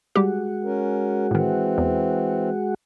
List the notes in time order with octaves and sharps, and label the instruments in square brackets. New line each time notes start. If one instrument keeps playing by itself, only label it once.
[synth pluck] G3 G4 [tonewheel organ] G#3 F#4
[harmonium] C#4 A#4
[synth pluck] A2 D#3 [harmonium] E3 C4
[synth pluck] E2